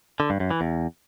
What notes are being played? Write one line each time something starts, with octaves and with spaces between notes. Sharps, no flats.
D3
G2
F#2
E3
E2